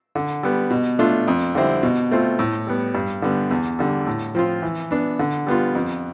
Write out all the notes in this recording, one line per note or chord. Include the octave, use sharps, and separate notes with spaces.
D3
G3 B3
B2
A3 D4 F4
F2
D3 G3 C4 E4
B2
A3 C4 F4
A2
G3 B3
G2
D3 G3 B3
E2
D3 G3
A2
F3 C4 F4
E3
B3 D4
D3
G3 B3 F4
F2